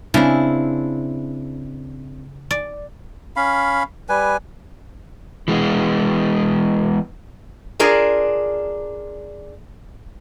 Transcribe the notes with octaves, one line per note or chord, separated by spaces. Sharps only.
C#3 C4 D4 E4
D5
C#4 F5 B5
G3 B4 G#5
E3 G#3 B3
D4 F4 G#4 A#4 D5